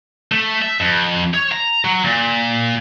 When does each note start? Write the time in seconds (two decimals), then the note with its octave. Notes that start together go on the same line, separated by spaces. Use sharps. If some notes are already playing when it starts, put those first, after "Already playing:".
0.32 A3
0.62 E5
0.80 F2
1.34 C#5
1.52 A#5
1.85 F#3
2.05 A#2